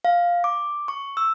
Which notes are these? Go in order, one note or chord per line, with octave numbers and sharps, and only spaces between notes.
F5
D6
C#6
E6